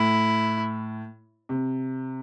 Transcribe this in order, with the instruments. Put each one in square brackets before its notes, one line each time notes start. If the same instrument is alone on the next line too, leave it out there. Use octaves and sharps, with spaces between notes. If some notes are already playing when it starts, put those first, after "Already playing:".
Already playing: [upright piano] A2 [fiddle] E4
[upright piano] C3